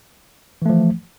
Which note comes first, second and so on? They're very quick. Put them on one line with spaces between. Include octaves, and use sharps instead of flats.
E3 A3 F3